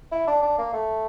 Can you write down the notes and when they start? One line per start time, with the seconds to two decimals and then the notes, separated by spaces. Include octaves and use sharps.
0.12 E4
0.27 D4
0.42 D4
0.58 A#3
0.73 A3